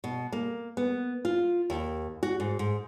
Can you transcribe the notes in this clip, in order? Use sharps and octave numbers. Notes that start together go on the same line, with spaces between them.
B2
A#3
B3
F4
D#2
F#4
G#2
G#2